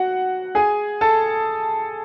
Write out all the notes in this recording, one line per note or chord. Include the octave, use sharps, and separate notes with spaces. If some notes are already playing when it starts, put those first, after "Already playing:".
Already playing: F#4 F#5
G#4 G#5
A4 A5